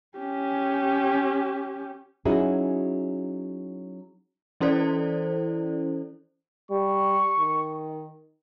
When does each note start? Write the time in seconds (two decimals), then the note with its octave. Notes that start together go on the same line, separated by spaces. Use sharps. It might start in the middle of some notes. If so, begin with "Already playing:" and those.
0.17 C#4 G4
2.25 F#3 C#4 D#4 E4 F#4 G#4
4.60 E3 C#4 E4 A4 C5 D5
6.71 G3 C#6
7.39 D#3